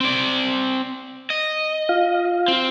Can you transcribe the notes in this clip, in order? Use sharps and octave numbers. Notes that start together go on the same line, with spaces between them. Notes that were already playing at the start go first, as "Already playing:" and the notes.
C4 D5
D#5
F4 F5
C4